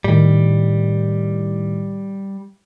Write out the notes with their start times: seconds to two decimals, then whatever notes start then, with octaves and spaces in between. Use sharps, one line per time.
0.04 A2 D#3 G3